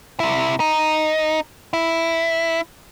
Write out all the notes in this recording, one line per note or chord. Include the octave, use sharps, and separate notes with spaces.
C3 E4
D#4
E4